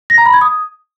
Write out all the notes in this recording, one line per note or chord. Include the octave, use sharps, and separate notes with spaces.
A#6
A#5
B5
G#6
D#6